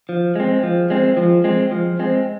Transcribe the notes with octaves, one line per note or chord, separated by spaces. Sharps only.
F3
G#3 C4
F3
G#3 C4
F3
G#3 C4
F3
G#3 C4